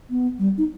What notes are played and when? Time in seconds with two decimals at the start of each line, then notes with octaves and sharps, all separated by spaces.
0.10 B3
0.39 G3
0.58 D#4